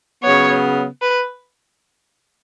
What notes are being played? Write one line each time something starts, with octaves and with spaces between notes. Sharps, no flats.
C#3 F#3 B3 C#5
B4